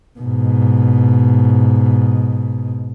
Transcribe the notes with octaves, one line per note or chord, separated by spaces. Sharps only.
G#2 B2